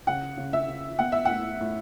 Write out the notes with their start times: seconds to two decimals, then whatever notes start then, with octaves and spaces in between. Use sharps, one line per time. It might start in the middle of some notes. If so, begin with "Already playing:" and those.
0.07 C#3 F#5
0.37 C#3
0.53 E5
0.68 C#3
0.99 B3 F#5
1.12 E5
1.25 F#5
1.30 A2
1.61 A2